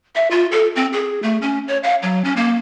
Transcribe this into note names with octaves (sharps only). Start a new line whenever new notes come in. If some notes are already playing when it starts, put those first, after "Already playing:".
E5
F4
A4
C4
G#4
A3
C#4
C#5
F5
F#3
C#4
A#3